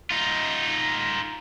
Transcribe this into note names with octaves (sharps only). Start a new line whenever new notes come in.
D#4 F4